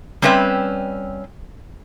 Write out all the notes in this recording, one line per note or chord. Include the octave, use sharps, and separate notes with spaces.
G3 C4 C#4 B4 E5